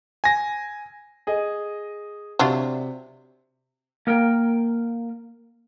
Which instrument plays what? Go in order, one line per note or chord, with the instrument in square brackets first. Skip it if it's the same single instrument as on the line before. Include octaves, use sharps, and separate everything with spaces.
[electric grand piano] G#5 A#6
[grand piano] G#4 D#5
[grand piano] C3 E5 [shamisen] F#3 D4 F4
[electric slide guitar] A#3 A#4 G5